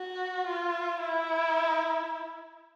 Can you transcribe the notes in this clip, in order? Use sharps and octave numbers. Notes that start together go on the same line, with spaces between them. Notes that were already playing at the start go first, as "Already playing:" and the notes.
Already playing: F#4
F4
E4